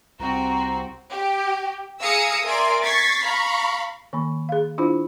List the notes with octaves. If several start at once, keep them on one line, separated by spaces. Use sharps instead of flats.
C2 C4 F#4 A#5
G4
G#4 F5 A#5 D#6 E6 C#7
A#4 D5 E5 G#5 C6 D7
C#6 G#6 A6 B6 C7
F5 A#5 B5 C#6
D#3 A#3 B5
G#4 F5
D4 E4 F4 C5 B5